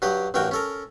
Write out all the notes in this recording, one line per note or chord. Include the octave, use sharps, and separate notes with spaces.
G2 F#3 G4 D#6
A1 G2 F#4 A#4 G5 G#5
C#4 A4 A#4